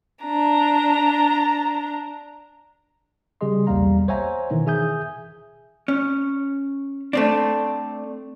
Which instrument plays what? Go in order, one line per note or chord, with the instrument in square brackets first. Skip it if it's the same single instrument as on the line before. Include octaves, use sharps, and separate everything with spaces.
[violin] D4 A#5
[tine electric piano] C#3 G3 G4 G#4 D#5 C6
B1 E2 G3 A#3 F5 A#5
C5 C#5 E5 F#5 G#5 A#5
B2 D#3 E3
G#4 E5 G#5 D#6 G6
[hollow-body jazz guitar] C#4
A3 C4 D4